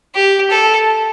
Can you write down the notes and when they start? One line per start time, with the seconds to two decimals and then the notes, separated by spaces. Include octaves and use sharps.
0.15 G4
0.50 A4